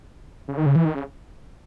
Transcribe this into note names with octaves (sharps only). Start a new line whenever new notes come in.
C#3
D#3
C#3
E3
D#3
C#3